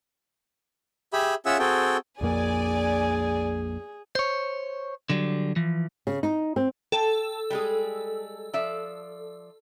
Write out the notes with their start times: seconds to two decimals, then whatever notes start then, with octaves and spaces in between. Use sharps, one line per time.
1.13 G4 G#4 E5 B5
1.46 C#4 F4 G#4 E5 F#5 E6
1.59 C4 F#4 G#4 A4 G5
2.21 A#1 F2 A#3 G#4 D5 G#5
4.15 C5 C#5
5.10 D3 F#3 G3
5.56 E3 F3
6.07 C#3
6.23 D#4
6.56 C4
6.92 A4 G5 A5
7.50 G3 G#3 G#4
8.54 F3 D5 E5